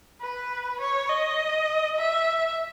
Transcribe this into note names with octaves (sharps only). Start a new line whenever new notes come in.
B4
C#5
D#5
E5